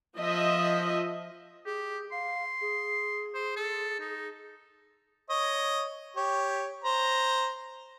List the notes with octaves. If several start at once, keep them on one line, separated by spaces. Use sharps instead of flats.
F3 D#5 E5
G4 G#4
F5 C6
G#4
C5
A4
D#4
C#5 D#5
G4 C#5
C5 A#5